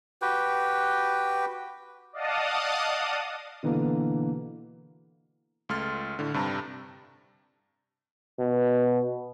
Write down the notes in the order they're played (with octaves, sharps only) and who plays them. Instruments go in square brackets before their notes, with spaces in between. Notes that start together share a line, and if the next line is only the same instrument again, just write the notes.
[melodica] F#4 G4 B4 G5
[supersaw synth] D5 D#5 F5 F#5 A5 D#6
[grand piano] B2 D3 E3 A#3
[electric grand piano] C#2 A3 C6 F6 A6
A2 D3
G2 C3 G3 A5 A#5
[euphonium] B2